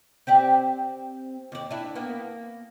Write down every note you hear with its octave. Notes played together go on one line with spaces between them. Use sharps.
C4 G4 D5
D#2 D5
D4 E4
A#3 B3